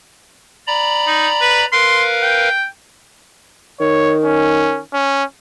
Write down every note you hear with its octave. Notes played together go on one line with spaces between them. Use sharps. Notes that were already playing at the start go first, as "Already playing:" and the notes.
D5 A#5 B5
D#4
B4
A#4 B4 F5 C6
G5
D#3 C#5
C#4
C#4